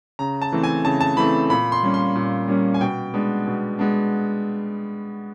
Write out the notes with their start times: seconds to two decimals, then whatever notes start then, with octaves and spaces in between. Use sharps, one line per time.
0.19 C#3 A#5
0.42 A5
0.52 E3 A3 C4
0.64 G#5
0.85 C#3 A5
1.01 A5
1.17 E3 A3 C4 B5
1.50 A#2 B5
1.72 C6
1.83 G3 A#3 C#4
1.94 C6
2.15 A#2
2.48 G3 A#3 C#4
2.74 G#5
2.81 B2 G5
3.14 G#3 B3 D4
3.47 B2
3.79 G#3 B3 D4